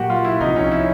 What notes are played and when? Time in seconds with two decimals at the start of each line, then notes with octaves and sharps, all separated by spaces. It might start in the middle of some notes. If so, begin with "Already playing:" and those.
Already playing: A#2 F#3 A#3 F#4 G4
0.10 F4
0.25 E4
0.41 C2 C3 F3 D#4
0.56 C#4
0.72 E4